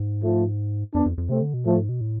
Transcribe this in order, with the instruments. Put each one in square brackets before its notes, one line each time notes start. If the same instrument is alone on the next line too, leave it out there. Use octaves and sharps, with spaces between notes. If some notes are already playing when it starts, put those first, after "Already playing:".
Already playing: [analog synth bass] G#2
[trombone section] F3 A3
[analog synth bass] F2 [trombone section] B3 D4
[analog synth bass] F2
F2
[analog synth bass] C3 [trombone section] A3 C4
[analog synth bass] D3
B2
[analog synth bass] A2 [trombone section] F3 A3
[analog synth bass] G#2
B2
A2